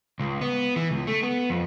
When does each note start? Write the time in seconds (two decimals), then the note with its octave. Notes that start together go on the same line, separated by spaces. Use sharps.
0.20 C#2
0.41 B3
0.76 E3
0.91 C#2
1.07 A3
1.22 B3
1.50 F2